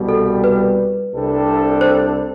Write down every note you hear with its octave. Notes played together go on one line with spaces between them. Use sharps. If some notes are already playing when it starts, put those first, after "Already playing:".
Already playing: C2 B2 G3
A4
B4
C2 C3 G3 D4 A4
C5